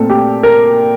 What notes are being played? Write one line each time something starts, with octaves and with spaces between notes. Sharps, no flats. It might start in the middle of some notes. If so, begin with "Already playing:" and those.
Already playing: A#2 A3 C4 A4
G4
A#4